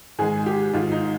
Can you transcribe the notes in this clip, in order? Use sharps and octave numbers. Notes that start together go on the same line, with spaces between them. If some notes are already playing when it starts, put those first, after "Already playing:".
G#2 D#3 G#3 G#4
G4
G#2 D#3 G#3 F4
D#4